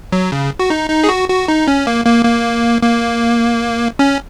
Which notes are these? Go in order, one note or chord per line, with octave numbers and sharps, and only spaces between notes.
F#3
C#3
F#4
D#4
D#4
G#4
F#4
F#4
D#4
C#4
A#3
A#3
A#3
A#3
C#4